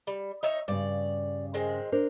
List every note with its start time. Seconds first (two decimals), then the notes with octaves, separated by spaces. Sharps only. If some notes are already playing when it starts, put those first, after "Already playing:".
0.07 G3
0.43 D#4 C#5 E5
0.68 G2 C#3 D5
1.54 D#3 G#3 C4
1.92 D4 A#4 C5